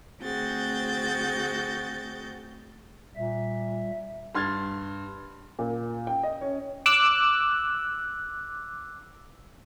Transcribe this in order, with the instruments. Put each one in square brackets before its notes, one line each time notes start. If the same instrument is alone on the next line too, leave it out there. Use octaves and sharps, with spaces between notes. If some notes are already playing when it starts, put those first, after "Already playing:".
[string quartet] D2 C4 F#4 G#4 G6 A6
[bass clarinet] A#2 [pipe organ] G3 E5
[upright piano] G2 C6 F6 G#6 A6
A#2
G5
D#5
C#4
[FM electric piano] D6 E6 F#6